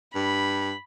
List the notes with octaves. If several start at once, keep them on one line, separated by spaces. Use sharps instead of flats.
G2 B5